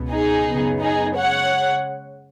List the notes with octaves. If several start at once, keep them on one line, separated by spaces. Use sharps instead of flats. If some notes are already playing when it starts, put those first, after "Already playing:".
Already playing: C#2 B2 B3
D#4 G#4
F#2 C#3 B3
D#4 G#4
C#3 G#3 C#5 F#5